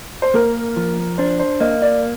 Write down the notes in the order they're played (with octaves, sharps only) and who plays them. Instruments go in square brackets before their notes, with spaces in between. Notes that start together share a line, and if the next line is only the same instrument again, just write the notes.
[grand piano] C5
[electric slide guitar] A#3 [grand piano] A#4
[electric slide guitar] F3
[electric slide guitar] D4 [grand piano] C5
[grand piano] C5
[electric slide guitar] A#3 [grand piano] D#5
[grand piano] D5